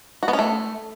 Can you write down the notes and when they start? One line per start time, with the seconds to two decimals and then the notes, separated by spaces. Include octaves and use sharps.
0.23 F#4
0.28 B3
0.33 C#4
0.39 A3